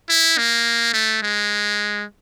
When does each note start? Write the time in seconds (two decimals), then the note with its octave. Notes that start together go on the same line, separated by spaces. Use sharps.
0.09 E4
0.38 A#3
0.94 A3
1.23 G#3